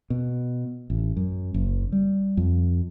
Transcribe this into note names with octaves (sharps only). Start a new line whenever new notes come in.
B2
A1
F#2
F#1
G3
F2